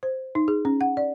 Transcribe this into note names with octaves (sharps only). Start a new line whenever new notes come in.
C5
D#4
G#4
C#4
F#5
D5